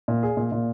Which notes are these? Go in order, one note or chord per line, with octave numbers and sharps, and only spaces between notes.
A#2
G#4
A#2
A#2